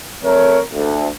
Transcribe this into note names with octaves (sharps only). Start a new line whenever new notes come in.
F2 A3 A#4 C#5
D2